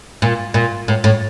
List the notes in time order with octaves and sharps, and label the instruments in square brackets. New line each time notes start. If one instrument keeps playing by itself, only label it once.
[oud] A#2
A#2
A2
A2